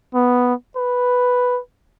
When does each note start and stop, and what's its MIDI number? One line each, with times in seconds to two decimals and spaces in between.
0.14 0.54 59
0.77 1.60 71